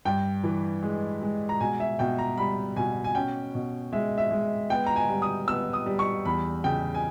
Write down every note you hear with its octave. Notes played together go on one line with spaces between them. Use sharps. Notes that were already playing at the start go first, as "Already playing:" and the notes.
G2 G5
E3
G#3
G#3
A#5
B2 G#5
E5
B2 G5
A#5
G3 B5
B2 G#5
G#5
C#4 G5
B2
G#3 E5
E5
G#3
B3 G5
A#5
G#5
G3
D#6
B3 E6
D#6
G3
C#6
E2 B5
C#3 G5
G#5